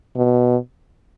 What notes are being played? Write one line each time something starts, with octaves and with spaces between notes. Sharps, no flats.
B2